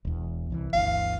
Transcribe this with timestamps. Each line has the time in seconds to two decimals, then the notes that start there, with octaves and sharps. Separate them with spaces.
0.05 E1 E2
0.50 C2 D#3 E3
0.73 G1 D2 E3 F5